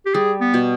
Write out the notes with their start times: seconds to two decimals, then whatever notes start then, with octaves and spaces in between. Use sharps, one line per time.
0.06 G4
0.14 G3 G#4
0.41 B3
0.54 B2